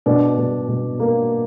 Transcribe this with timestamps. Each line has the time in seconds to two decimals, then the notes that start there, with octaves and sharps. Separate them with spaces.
0.06 B2 D4 D5
0.38 B2
0.68 B2
1.00 A#3